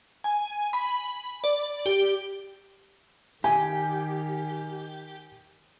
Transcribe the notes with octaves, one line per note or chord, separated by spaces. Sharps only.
G#5
B5
D5
G4
D#3 G4 G#5